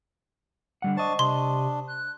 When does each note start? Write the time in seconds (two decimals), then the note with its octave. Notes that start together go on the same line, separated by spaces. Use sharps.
0.82 D3 G3 F#5
0.97 D4 C5 D#5 A5 C#6
1.19 C3 D4 C6
1.88 F#6